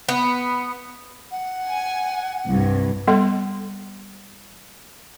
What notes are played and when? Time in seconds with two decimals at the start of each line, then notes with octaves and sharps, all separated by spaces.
0.09 B3
1.31 F#5
1.67 G#5
2.47 C2 G2
3.08 G3 B3 A4 C6